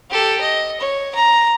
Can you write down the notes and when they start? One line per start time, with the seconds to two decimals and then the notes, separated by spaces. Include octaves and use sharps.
0.10 G4 A4
0.41 D#5
0.80 C#5
1.15 A#5